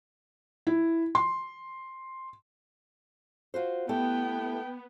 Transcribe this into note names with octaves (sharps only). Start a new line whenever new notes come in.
E4
C6
F4 F#4 C5
A3 B3 E4 G4 G5